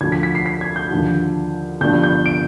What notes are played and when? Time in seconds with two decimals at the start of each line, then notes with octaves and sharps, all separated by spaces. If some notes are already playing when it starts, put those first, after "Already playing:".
0.01 D2 D3 F3 G#6
0.12 B6
0.23 B6
0.35 C7
0.46 B6
0.61 G#6
0.76 G6
0.91 D#2 D3 F3
1.81 G1 G2 F3 G6
2.03 G6
2.26 D7